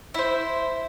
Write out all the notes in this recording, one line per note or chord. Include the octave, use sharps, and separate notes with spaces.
E4 C5